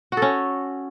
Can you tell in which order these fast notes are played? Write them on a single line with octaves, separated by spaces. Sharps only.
F#4 A4 C#4